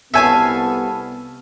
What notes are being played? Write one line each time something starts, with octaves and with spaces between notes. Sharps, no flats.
C2 B3 A4 C#5 E5 F5 G#5